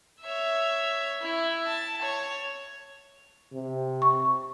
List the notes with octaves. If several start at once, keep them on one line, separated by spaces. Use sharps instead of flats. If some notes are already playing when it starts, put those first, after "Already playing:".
C#5 E5
E4
A5
C#5
C3
C#6